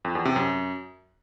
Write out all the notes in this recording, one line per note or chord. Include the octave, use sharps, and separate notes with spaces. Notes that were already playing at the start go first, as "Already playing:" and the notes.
F2
E2
C3
F#2